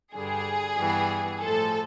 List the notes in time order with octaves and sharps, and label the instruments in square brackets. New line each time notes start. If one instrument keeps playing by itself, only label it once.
[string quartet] G2 D3 G3 [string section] G#4
[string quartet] G2 E3 G3 B3
[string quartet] A2 F3 G#3 [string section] A4